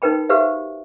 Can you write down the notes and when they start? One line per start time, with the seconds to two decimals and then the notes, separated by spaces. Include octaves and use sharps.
0.02 D#4 A#4 B4 G5 B5
0.29 F#4 G4 B4 C5 E5 F5